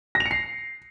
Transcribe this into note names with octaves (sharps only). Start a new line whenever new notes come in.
A#6
F7
C#7
C7